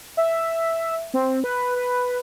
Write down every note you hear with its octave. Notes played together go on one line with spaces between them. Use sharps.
E5
C4
B4
B4